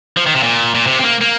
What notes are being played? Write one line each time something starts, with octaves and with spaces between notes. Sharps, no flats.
F3
D#3
C3
A#2
A#2
C3
C4
A#3
A#3